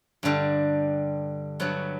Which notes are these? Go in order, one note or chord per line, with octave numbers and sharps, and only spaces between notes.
G2 D3 G3
G2 F#3 B3